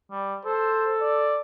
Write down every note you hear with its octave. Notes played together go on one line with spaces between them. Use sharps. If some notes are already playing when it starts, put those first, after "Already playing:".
G3
A4 C5
D5